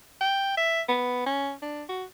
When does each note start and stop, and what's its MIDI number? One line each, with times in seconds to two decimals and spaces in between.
0.21 0.54 79
0.57 0.81 76
0.89 1.22 59
1.26 1.53 61
1.62 1.83 62
1.89 2.04 66